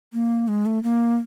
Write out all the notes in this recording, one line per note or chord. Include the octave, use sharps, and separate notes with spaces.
A#3
G#3
A3
A#3